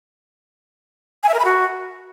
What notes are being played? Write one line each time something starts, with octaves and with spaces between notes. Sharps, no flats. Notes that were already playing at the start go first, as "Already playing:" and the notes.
G#5
E5
A#4
B5
F#4